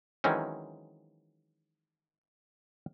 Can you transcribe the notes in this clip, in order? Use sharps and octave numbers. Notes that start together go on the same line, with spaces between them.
D#3 E3 F#3 G#3 C4 C#4